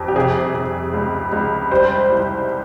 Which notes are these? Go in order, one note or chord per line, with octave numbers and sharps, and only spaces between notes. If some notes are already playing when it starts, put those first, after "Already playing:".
Already playing: F2 G3
G4
C3 G#4
C3
C#2
C#2
G3 C5
C2